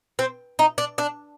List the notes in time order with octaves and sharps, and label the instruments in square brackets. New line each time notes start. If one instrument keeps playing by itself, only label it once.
[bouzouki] C4
D#4
D4
D4